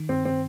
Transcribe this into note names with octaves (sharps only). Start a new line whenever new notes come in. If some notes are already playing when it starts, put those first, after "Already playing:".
Already playing: D#3
G2 C4
C4